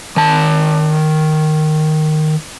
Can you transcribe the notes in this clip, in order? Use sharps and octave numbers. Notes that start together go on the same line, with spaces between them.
D#3 A5